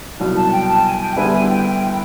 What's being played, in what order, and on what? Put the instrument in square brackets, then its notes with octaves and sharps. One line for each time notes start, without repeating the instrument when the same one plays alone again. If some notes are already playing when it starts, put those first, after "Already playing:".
[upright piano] C2 B2 F#3
[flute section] A5
G5
A5
G#5
G5
[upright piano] D3 G3 B3 E4 [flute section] G#5
[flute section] G#5
G5
G5
G5